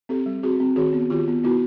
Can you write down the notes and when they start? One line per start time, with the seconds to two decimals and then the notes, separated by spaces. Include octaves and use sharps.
0.09 C4 G4 A4
0.26 G3
0.43 C4 F#4 G#4
0.60 C4
0.76 D#3 F#4 G#4
0.93 B3
1.10 D#3 F4 G4
1.28 B3
1.44 B3 E4 F#4